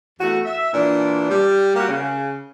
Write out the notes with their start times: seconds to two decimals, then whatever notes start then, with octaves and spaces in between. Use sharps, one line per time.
0.19 E2 A3 F#4
0.45 E5
0.73 A#2 E3 D4
1.30 G3
1.75 A#3 F#4 G4
1.89 C#3